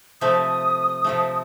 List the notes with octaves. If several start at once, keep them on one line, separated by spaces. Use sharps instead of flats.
C3 F3 A3 D#6
C3 F3 A3